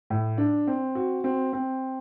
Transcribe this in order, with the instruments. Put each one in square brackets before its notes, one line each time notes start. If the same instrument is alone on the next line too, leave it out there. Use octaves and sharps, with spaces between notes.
[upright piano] A2
D4
C4
F#4
C4
C4